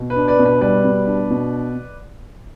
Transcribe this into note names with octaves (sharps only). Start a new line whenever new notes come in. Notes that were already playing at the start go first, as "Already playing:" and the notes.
Already playing: B2
B4
D4
B4 D5
B2
B4
G3 B4 D5
B2
D4
B2